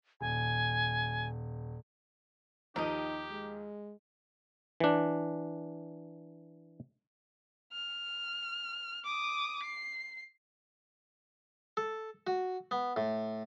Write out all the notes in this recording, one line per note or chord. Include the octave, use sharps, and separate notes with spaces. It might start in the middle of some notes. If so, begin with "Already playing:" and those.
D#1 G#5
D#2 F3 D#4 G4 A#4 D#5
G#3
E3 D4
F6
D6 D#6
C7
A4
F#4
B3
A2